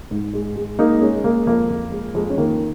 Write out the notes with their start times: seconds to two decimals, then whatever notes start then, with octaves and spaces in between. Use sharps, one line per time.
0.11 G#2
0.34 G#3
0.56 G#3
0.79 G#3 A#3 D#4
0.98 A#3
1.01 G#3 C#4
1.24 G#3 A#3
1.47 F2 A#3
1.70 F2
1.92 G#3
2.15 F2 G#3
2.30 C#4
2.38 D#3 A#3